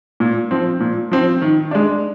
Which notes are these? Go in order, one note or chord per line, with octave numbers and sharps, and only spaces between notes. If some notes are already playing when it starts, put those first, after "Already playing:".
A#2
F3 C4
A#2
F3 C4
D#3
G#3 D4